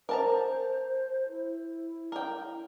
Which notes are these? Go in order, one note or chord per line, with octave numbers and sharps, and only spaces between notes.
A#4 C5 A5 A#5
E4
A#4 G5